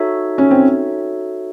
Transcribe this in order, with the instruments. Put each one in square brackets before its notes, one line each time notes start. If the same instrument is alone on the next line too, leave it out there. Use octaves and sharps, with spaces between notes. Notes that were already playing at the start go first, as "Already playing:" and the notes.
Already playing: [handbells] D#4 F#4 A4 C#5 E5
[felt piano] C#4
C4